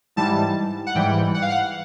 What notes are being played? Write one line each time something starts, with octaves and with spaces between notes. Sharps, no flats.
G#2 E3 G3 A5
F#5
G#2 E3 G3 G5
F#5
F5
F#5